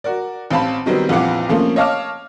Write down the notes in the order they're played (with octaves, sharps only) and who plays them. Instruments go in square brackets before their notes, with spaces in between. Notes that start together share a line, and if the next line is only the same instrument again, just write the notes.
[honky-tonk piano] F#4 A#4 D5
A1 C4 F5 A5 B5
C3 D#3 F#3 G3 B3 C4
A#1 F2 E3 F4 F#5 D6
C3 F3 A3 A#3 C#4
C#5 D#5 F5 A5 D6 F6